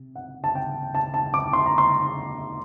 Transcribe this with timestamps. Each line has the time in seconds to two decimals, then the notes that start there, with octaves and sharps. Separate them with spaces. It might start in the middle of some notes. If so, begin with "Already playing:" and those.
Already playing: C3
0.16 F#5
0.44 A5
0.55 G5
0.95 A5
1.14 A5
1.34 D6
1.53 C6
1.66 A#5
1.78 C6